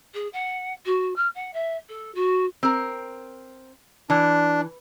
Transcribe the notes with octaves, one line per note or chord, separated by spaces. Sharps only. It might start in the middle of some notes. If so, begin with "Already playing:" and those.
G#4
F#5
F#4
F6
F#5
E5
A4
F#4
C4 A#4
E3 D4